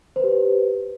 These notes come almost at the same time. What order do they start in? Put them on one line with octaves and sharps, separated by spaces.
C5 B4 G4